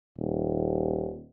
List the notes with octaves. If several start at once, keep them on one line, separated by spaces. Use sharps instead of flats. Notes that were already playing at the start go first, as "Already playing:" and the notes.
D#1